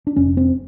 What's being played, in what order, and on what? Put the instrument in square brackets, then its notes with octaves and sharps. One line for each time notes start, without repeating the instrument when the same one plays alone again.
[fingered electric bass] D4
F1 C#4
C4